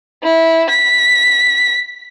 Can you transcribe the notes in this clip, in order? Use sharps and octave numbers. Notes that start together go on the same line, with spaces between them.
E4
B6